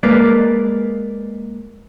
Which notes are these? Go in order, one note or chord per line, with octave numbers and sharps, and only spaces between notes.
G#3 A#3 B4 D5